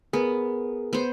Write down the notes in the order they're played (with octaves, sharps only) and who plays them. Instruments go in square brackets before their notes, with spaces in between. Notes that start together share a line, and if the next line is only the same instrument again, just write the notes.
[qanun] B3 [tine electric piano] G#4 A#4
[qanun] B3 C5